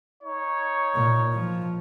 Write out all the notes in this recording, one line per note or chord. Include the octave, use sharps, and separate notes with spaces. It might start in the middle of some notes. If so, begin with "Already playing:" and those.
D#4 C#5
A#2
F3